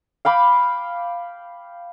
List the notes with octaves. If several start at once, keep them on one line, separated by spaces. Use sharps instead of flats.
F5 G5 B5 D6